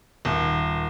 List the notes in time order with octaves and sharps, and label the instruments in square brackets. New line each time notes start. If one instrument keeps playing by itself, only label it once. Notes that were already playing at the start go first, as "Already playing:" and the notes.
[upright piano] D#1